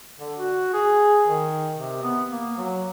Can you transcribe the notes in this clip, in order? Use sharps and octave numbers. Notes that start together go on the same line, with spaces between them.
D3
F#4
G#4
D#3
C3
B3
A#3
F#3